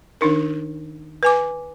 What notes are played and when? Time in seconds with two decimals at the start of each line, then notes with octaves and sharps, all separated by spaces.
0.21 D#3 D4 D#4 A#4
1.23 B4 G#5 D6